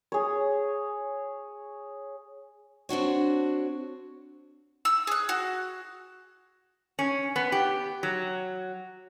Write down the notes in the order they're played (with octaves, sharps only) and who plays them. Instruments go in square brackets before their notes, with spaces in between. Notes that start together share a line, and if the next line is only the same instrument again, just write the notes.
[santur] G#4 C#5
[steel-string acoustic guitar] C4 D4 F#4 C#5
[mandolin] E6
G#4 F#6
F#4
[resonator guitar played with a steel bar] C#4
B3
G4
F#3